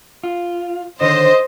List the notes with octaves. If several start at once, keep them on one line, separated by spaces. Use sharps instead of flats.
F4
D3 D#3 C5 C#5 D#5